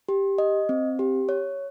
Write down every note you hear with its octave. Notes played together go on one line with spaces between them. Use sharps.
G4
D#5
C4
G4
C#5